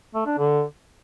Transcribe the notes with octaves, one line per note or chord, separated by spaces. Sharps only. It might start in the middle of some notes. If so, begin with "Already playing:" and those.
A3
D4
D3